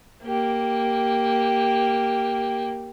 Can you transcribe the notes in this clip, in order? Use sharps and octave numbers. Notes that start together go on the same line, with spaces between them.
A#3 G4